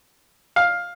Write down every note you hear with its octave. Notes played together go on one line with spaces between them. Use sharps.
F5